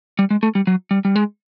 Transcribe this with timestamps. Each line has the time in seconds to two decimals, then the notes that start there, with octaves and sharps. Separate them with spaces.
0.19 G3
0.31 G#3
0.43 A3
0.55 G3
0.67 F#3
0.91 G3
1.05 G3
1.16 G#3